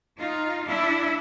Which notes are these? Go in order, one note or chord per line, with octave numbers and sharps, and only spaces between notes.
D#4 F4
D4 E4